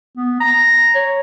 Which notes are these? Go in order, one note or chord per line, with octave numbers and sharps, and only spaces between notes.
B3
A#5
C#5